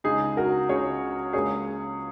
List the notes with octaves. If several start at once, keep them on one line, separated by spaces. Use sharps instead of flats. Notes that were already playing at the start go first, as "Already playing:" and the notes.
C#2 C#3 G#3 D#4 G#4
F#4 A#4
C#2 C#3 G#3 G#4 C#5
C#2 C#3 A#3 G#4 C#5